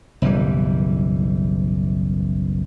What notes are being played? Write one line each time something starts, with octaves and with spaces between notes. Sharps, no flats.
F#1 B1 E3 G3